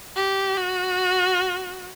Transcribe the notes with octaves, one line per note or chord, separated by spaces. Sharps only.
G4
F#4